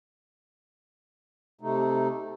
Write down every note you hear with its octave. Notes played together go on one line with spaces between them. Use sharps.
C3 A3 D#4